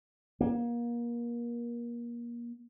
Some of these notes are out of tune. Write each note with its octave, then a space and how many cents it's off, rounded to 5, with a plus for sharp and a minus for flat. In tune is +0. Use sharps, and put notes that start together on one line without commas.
A#3 +30